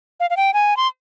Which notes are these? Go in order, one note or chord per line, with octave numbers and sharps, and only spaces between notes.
F5
F5
G5
G#5
C6